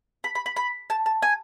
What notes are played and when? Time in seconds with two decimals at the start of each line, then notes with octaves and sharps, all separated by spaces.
0.24 B5
0.35 B5
0.46 B5
0.56 B5
0.90 A5
1.06 A5
1.22 G#5